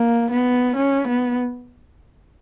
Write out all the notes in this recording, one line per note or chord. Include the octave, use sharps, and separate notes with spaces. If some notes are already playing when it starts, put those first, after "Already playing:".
Already playing: A#3
B3
C#4
B3